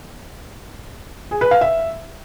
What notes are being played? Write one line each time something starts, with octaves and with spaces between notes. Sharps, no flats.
G#4
B4
F5
E5